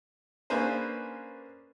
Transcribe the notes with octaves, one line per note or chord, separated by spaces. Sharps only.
A#3 C#4 D4 G#4 B4 C5